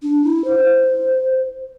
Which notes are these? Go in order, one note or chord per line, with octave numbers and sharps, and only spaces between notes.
D4
E4
C5